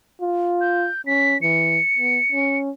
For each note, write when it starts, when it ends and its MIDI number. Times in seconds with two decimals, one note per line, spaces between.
0.21 0.87 65
0.61 1.01 91
1.07 1.36 61
1.07 1.38 95
1.42 1.79 52
1.42 2.58 97
1.97 2.19 59
2.32 2.70 61